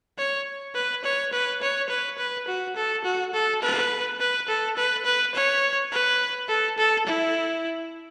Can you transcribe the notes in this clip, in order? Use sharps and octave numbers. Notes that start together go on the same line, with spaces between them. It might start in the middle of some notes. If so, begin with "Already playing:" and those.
C#5
B4
C#5
B4
C#5
B4
B4
F#4
A4
F#4
A4
B4
B4
A4
B4
B4
C#5
B4
A4
A4
E4